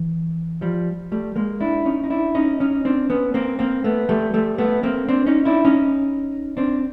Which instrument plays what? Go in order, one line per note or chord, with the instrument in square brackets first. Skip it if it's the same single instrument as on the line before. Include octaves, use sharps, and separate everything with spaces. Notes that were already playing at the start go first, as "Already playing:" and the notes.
Already playing: [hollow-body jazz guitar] E3
F3 G3
G3 A3
G#3 A#3
D4 E4
C#4 D#4
D#4
D4 E4
C#4 D#4
C#4 D#4
C4 D4
B3 C#4
A#3 C4
A#3 C4
A3 B3
G3 A3
G3 A3
A3 B3
A#3 C4
C4 D4
C#4 D#4
D4 E4
C#4 D#4
C4 D4